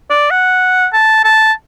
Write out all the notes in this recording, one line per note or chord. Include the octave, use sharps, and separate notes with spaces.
D5
F#5
A5
A5